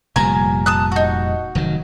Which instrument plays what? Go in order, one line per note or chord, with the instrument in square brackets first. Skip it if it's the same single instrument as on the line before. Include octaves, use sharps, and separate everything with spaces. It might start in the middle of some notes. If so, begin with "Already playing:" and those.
[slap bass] F1 A#2 G3 [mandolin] G#5 A#5
[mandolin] A5 D#6 F#6
D#4 F#4
[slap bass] F1 D#3 F#3